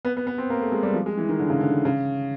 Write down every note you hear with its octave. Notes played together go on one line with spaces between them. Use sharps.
B3
B3
B3
C4
A#3
A3
G#3
G3
F3
G#3
E3
D#3
D3
C#3
D3
C#3